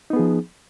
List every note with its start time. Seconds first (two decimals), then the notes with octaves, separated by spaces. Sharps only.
0.10 D#4
0.13 B3
0.16 G#4
0.19 F3